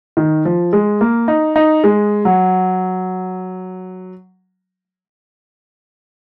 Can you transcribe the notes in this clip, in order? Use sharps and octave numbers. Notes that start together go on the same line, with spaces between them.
D#3
F3
G#3
A#3
D#4
D#4
G#3
F#3